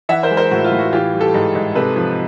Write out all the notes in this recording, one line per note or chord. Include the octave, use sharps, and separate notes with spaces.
E3 E5 F#5
A#4 C5
G#3
A#4 C5
A2 F#4
F4
A2
F#4
E3 F4 G4
G3
G4 A4
G#2
G#2
C3 A4 B4
F3